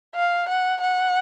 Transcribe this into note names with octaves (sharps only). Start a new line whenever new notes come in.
F5
F#5
F#5